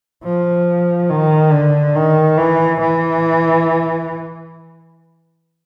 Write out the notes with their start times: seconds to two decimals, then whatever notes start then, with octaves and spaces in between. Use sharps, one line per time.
0.24 F3
1.09 D#3
1.52 D3
1.95 D#3
2.38 E3
2.80 E3